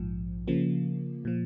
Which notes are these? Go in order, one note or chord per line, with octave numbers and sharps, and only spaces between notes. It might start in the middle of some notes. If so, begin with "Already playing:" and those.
Already playing: A#1 G#2 F3
C#3 F3 A#3
A#2 F3